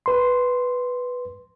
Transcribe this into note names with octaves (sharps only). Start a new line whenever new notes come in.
B4 C6